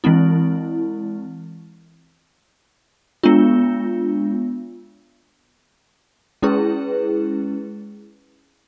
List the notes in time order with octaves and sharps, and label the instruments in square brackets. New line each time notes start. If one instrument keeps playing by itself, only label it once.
[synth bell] E3 G#3 C4 E4
G#3 B3 D4 F4
G#3 C#4 E4 G#4 B4